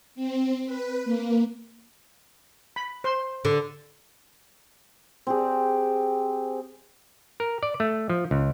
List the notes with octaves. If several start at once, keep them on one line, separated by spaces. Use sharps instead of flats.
C4
B4
A#3
B5
C5 C6
D3
C4 G4 G#4
A#4
D5
A3
F3
C#2